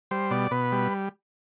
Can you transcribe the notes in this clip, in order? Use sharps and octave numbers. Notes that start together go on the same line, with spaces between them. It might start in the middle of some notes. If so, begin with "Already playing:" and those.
G3 C5
B2 D5
B2 B4
G3